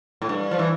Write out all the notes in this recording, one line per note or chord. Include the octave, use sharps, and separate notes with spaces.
A2
G2
F3
E3